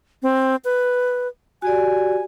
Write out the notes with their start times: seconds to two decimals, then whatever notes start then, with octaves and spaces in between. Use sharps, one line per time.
0.23 C4
0.64 B4
1.62 F#4 G4 D5 G#5